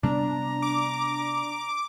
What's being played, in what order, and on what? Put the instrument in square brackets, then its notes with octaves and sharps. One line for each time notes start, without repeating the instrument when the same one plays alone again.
[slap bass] C3 G3 B3 [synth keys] D4 [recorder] A#5
[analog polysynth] D6